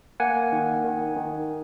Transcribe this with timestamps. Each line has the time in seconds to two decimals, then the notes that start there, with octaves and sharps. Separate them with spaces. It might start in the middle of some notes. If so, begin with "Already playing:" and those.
0.20 A#3 F#5 G#5
0.52 D#3
0.85 D#3
1.17 D#3